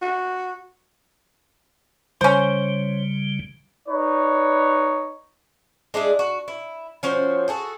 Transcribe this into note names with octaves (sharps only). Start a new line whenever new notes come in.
F#4
C#3 G3 C#4 C5
D#4 B4 C#5 D5
G#3 D4 E4 G#4
F#4
E4
F3 C#4 F#4 C5
F#4 G#4 A4